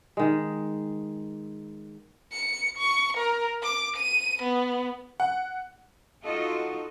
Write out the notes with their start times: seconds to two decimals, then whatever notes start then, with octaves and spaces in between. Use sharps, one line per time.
0.17 D#3 G#3
2.32 C#7
2.78 C#6
3.17 A#4
3.62 D6
3.97 D#7
4.43 B3
5.20 F#5
6.23 D#4 F4 F#4 A4 D#5